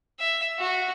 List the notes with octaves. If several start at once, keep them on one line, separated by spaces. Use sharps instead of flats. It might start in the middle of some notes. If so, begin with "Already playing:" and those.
E5
F#4